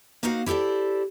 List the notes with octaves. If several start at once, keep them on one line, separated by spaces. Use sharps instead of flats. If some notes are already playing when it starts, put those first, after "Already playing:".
A#3 D#4 F#4 C5 F5 F#5
E4 G4 A4 C5 D5